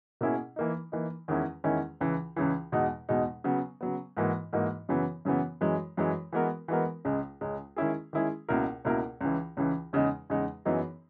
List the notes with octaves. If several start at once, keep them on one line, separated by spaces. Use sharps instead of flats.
B2 A#3 C#4 E4 G#4
E3 A#3 D#4
E3 A#3 D#4
E2 D#3 G#3 C#4 E4
E2 D#3 G#3 C#4 E4
C#2 C#3 E3
C#2 C#3 E3
E2 B2 G#3 D#4
E2 B2 G#3 D#4
C#3 F#3 B3
C#3 F#3 B3
G#2 E3 A#3 D#4 F#4
G#2 E3 A#3 D#4 F#4
F#2 C#3 E3 B3
F#2 C#3 E3 B3
F#2 E3 G#3
F#2 E3 G#3
E3 G#3 B3 F#4 A#4
E3 G#3 B3 F#4 A#4
C#2 C#3 G#3
C#2 C#3 G#3
D#3 G#3 C#4 E4 G#4
D#3 G#3 C#4 E4 G#4
C#2 B2 A#3 E4 A#4
C#2 B2 A#3 E4 A#4
C#2 C#3 E3
C#2 C#3 E3
E2 C#3 G#3 D#4
E2 C#3 G#3 D#4
F#2 E3 B3 D#4 G#4